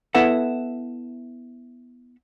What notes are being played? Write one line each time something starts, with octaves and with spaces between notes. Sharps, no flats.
B3 E4 A4 B4 E5 F#5